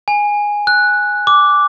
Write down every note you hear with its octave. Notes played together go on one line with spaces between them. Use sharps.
G#5
F#6
D6